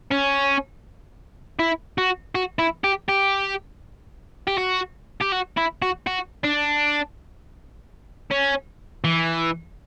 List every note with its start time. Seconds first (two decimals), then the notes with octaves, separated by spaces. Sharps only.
0.11 C#4
1.59 E4
1.98 F#4
2.35 F#4
2.59 E4
2.84 G4
3.09 G4
4.48 G4
4.58 F#4
5.21 G4
5.33 F#4
5.57 E4
5.82 F#4
6.07 F#4
6.44 D4
8.31 C#4
9.04 E3